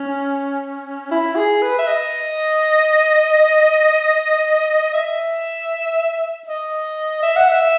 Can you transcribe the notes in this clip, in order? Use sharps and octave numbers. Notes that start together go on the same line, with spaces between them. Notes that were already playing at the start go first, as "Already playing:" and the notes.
Already playing: C#4
E4
G#4
B4
E5
D#5
E5
D#5
E5
F#5
E5